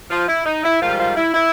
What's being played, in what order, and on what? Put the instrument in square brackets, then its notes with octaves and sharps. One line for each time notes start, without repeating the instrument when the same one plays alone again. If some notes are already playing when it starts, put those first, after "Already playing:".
[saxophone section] F3 F4
E4
D#4
E4
G#2 D#3 F3 G3 F4
F3 F4
E4
E4